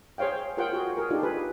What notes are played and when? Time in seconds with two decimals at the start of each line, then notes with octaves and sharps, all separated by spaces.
0.18 G#4 C5 C#5 F5 G5
0.57 F4 G#4 A#4 C5 F#5 G5
0.73 F#4 G#4
0.97 G#4 A#4
1.10 D4 D#4 F4 G4 A4
1.23 G#4 B4